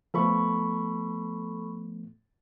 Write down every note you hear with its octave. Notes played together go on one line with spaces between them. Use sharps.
F3 A3 B3 A4 B5 C#6